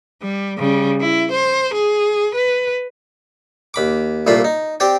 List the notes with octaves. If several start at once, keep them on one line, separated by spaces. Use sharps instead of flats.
G3
C#3 G3
E4
C5
G#4
B4
D#2 B5 D6
C2 A#2 A3 F4 B5
D#4
C4 G4 D5 G5